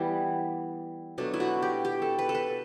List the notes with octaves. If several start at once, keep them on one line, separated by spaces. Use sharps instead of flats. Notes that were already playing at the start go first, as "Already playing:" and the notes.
Already playing: E3 G3 B3 E4
B2 F#3 A3 D4
E4
F#4
G4
G4
A4
B4
A4
B4